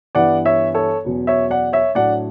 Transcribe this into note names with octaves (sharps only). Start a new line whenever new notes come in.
G2 E3 G3 B3 E4 D5 F#5
C#5 E5
A4 C#5
E2 B2 F#3 C#4
C#5 E5
D5 F#5
C#5 E5
A2 F#3 A3 D4 D5 F#5